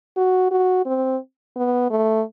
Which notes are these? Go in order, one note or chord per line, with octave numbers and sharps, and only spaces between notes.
F#4
F#4
C4
B3
A3